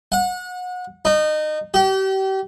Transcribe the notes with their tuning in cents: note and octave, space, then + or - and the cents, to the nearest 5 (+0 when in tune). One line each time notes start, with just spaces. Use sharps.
F#5 -30
D#4 -25
G4 -35